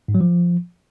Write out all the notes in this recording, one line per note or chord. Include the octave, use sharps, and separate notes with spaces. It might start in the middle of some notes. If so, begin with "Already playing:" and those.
G#2
F#3
F3